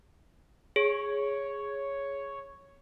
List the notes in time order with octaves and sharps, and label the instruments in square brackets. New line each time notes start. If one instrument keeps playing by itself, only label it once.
[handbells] G#4 [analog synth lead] C#5